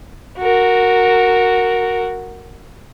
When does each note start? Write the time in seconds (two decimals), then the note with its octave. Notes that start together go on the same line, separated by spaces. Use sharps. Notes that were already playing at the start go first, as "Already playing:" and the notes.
0.38 F#4 A#4